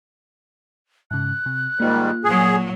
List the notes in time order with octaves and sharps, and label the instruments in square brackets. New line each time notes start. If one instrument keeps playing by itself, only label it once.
[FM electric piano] G#2 C#3 [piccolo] F#6
[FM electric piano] C3
[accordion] G#2 D#3 G3 [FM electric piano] A#3 F4
[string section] A#2 F#3 [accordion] G#4